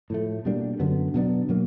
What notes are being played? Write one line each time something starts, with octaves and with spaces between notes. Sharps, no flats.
A2 F3 A3
B2 G3 A#3 D4
F#2 D3 F#3 B3
B2 F#3 B3 D4
B2 F#3 A#3